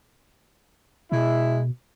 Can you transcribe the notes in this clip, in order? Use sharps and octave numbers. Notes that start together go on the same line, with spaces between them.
B2 G#3 E4